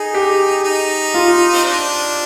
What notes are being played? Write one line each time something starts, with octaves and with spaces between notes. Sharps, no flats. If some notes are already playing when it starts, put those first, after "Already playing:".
Already playing: D#4 G#4
G4
D#4
F4
C4
D4